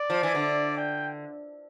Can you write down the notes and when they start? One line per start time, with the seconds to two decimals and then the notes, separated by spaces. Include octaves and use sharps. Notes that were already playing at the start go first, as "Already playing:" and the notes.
Already playing: D5
0.10 F3
0.23 E3
0.35 D3
0.77 G5